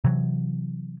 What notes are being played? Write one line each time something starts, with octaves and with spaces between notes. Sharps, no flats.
C3 E3 F#3